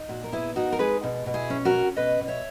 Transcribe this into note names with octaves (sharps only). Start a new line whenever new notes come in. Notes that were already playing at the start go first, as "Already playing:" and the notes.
Already playing: D#4
A#2 F#4
A#4
B3 E4 G#4
D#4 F#4 A#4
A#4
G#3 G#4 B4
B2
B2
E4 G#4
C#4
F#4 A#4
C#4
B2 B4 D#5
B2
C#5 E5